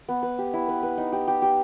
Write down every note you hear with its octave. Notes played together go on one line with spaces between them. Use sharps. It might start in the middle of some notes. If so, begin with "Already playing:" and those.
B3
B4
G4
E4
B4
B4
D#4
G4
G4
G4